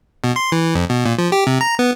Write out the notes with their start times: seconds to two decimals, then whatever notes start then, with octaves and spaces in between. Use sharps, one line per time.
0.24 B2
0.36 C6
0.52 E3
0.75 F2
0.90 B2
1.05 A#2
1.18 F3
1.32 G4
1.47 C3
1.61 A#5
1.79 B3